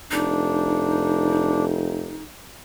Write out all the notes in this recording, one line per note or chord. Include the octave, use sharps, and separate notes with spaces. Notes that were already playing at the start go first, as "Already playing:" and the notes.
F1 D4 D#4